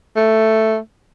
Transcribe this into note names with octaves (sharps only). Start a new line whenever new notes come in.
A3